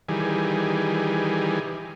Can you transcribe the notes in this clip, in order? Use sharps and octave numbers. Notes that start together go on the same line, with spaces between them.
D#3 E3 G3 G#4